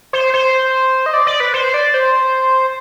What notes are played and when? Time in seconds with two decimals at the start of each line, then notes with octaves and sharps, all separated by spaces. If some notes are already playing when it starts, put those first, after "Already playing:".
0.13 C5
0.34 C5
1.06 D#5
1.13 D5
1.27 D5
1.40 B4
1.54 C5
1.74 D5
1.94 C5